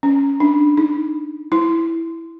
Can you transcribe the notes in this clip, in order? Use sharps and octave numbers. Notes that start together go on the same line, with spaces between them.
C#4
D4
D#4
E4